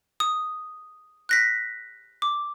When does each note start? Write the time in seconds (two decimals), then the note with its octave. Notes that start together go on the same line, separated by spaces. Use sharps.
0.20 D#6
1.29 F#6 A#6 B6
2.22 D6